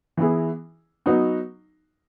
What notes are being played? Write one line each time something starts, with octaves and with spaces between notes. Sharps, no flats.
E3 B3 E4 G#4
F#3 B3 D#4 F#4